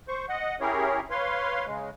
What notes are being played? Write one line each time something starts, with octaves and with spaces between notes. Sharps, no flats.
C5 C#6
D#5 F#5
C#4 E4 G4 G#4 A#4 C#5
B4 C#5 F5 C6
C#3 G#3